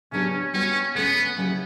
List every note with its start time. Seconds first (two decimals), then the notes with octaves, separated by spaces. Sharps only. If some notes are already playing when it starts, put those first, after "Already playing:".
0.12 C#3 F#3 B3 C#4 D4 G4
0.54 G3 B3 C#4 D4 F#4
0.95 D3 A3 B3 C#4
1.37 C#3 F#3 C#4 E4 G4